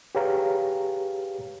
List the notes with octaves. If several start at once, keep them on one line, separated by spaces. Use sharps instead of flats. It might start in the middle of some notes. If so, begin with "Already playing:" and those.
G4 G#4 B4 C#5 F5 A#5